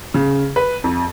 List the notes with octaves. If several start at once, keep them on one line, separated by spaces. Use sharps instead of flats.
C#3
B4
F2